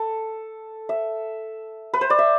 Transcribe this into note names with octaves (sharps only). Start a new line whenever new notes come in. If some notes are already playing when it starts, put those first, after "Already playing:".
Already playing: A4
E5
B4
C5
D5
E5